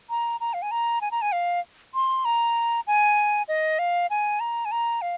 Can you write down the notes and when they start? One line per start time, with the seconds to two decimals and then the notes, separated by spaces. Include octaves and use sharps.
0.10 A#5
0.40 A#5
0.54 F5
0.62 G#5
0.71 A#5
1.01 G#5
1.11 A#5
1.22 G#5
1.32 F5
1.94 C6
2.25 A#5
2.87 G#5
3.48 D#5
3.79 F5
4.10 G#5
4.40 A#5
4.65 G#5
4.72 A#5
5.02 F5